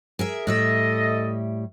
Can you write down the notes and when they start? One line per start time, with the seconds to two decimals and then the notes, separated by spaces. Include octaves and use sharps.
0.19 G#4 A#4 E5
0.47 A2 G3 A4 D#5 E5